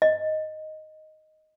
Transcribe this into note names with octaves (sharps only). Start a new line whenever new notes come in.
D#5